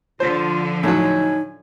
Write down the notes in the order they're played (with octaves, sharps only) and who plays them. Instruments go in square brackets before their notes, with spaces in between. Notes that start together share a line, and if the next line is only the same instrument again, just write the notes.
[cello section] D3 F3 [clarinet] F4 [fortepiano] C5
[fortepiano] A2 F#3 [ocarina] D#4 [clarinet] G#5